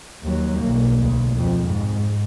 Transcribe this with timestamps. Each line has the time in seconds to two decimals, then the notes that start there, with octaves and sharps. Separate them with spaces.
0.23 D#2 F#3
0.60 B1 A#3
1.00 D2
1.36 F2
1.68 G#2